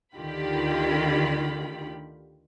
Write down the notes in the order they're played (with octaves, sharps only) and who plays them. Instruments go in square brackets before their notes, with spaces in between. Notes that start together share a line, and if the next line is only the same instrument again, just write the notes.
[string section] D2 D3 D#3 F4 G4 B5